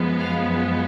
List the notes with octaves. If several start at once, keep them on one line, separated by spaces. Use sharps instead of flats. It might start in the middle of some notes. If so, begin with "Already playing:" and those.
Already playing: F#2 F3 G#3 B3
F5